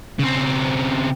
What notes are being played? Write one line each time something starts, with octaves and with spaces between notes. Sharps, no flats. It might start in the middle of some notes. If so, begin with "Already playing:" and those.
C#3 C4